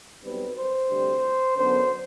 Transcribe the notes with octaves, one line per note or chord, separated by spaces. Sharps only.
B1 B2 G3 C4 B4
C5
D2 C3 G3 C4
F#2 D3 F#3 B3 C5